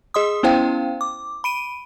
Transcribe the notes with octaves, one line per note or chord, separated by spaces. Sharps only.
G#4 D#5 C6 D#6
B3 C#4 E4 C5 F5 G5
D6
B5 D7 D#7